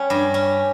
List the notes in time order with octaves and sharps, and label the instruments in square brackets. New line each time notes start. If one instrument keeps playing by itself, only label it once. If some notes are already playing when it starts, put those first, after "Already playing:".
Already playing: [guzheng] G3 C#4
G2
C#4